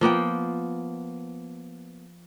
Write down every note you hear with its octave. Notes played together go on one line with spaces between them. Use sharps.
F3 A#3 B3 G5